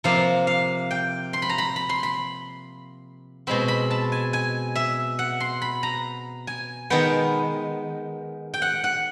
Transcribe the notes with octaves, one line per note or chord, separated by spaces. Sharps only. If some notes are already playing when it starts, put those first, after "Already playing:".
C3 F3 A#3 F5
F5
G5
C6
B5
A#5
B5
B5
C6
B5
B2 G#3 C4 B5
B5
A5
G#5
G#5
E5
F#5
C6
B5
A#5
G#5
D#3 G#3 B3 G5
G5
F#5
F#5